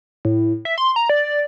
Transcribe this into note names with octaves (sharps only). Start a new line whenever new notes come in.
A2
E5
C6
A#5
D5